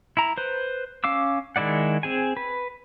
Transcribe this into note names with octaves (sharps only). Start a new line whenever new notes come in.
E4 A#5
B4 C5
C#4 F5 D6 E6
D#3 G#3 E4 D5 F#5
C4 G#4 G#5
B4